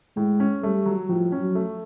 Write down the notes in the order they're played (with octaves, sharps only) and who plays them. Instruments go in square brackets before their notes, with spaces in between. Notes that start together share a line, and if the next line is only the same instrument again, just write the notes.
[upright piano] A2 [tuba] G#3
[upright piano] C#4
[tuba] G3 [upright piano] A3
[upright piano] F#3
[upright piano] A2 [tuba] F3
[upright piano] C#4
[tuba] F#3
[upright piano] A3